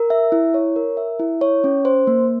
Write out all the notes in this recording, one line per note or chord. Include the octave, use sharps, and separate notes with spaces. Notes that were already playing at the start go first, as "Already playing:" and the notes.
Already playing: A#4
E5
E4
C#5
A#4
E5
E4
C#5
C#4
C5
A#3